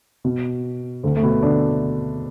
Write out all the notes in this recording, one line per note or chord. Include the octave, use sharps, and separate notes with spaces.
B2
D2 D3
A3
B2 B3
D3 D4